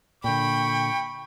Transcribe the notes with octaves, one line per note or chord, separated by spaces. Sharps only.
A#2 D3 G5 B5 C#6